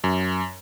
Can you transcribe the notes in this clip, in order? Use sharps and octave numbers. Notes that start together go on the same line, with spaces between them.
F#2